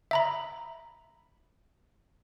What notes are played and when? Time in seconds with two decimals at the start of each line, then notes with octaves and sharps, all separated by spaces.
0.11 E5 A#5 B5